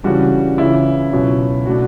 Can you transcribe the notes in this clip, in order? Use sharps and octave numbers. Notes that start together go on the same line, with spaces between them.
C#3 E3 G3 D4 F#4
C#2 C#3 E3 E4
C#2 B2 F#3 C#4
B2 A3 D4 F#4